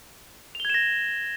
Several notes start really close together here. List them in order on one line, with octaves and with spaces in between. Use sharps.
F7 G7 G#6 E7 A#6